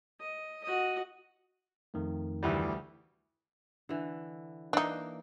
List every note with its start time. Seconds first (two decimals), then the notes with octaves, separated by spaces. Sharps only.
0.20 D#5
0.64 F#4 D#5
1.94 F2 D#3 A3
2.43 D2 E3 G3
3.89 D3 E3
4.73 E3 A#3 D4 D#4